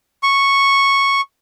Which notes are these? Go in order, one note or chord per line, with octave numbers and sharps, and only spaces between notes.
C#6